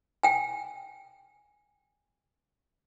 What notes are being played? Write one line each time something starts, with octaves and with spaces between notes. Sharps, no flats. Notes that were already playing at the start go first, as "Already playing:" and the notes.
G5 G#5